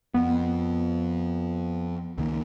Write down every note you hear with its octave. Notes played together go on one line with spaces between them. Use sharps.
F2 B3
C#2 D#3 A#3